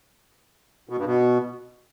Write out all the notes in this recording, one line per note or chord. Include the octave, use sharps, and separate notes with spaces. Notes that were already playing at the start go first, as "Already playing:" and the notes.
B2
G2
B2